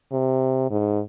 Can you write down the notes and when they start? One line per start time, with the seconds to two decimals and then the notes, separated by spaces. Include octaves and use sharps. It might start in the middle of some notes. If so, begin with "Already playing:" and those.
0.12 C3
0.70 G#2